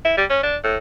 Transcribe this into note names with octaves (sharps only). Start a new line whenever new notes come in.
E4
G3
C#4
D4
A2